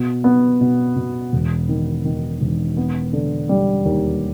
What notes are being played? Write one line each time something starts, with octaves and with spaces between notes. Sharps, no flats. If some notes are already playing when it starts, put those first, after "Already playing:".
Already playing: B2
B3
B2
B2
E1
D#3
D#3
E1
B3
D3
G3
D#2